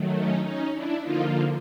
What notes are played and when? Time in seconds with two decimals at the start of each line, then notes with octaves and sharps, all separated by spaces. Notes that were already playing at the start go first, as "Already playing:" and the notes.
Already playing: D#3 F#3 A3
0.16 C#4 D#4
0.45 C#4 D#4
0.74 D4 E4
1.02 D3 F3 A#3 D#4 F4